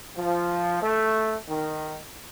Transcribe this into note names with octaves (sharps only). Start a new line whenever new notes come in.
F3
A3
D#3